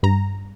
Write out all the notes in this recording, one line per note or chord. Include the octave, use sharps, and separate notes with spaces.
G2 A#5